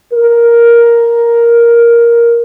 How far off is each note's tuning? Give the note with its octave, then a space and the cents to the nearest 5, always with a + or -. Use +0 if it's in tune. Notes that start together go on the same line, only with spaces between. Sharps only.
A#4 +5